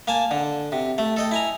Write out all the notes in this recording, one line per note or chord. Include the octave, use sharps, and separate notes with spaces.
A#3 G#5 A5
D3
C3
A3
A4 D#5 G5
E4 G#5 A#5